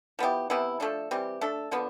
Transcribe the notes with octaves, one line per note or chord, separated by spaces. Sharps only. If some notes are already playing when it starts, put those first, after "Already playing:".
F3 B3 E4 G4
C3 E3 B3 E4
F3 A3 D4 A4
E3 G3 C4 G4
A3 D4 A4
D3 F3 B3 D4